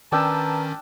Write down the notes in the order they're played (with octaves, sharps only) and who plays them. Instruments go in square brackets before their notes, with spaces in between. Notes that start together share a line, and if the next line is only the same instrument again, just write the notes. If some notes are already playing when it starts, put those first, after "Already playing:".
[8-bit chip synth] D#3 C#4 [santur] D4 G5 E6 [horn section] B4 A5 A#5